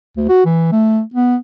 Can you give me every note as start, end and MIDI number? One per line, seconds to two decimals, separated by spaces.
0.17 0.26 38
0.29 0.45 66
0.45 0.68 52
0.72 1.01 57
1.14 1.36 59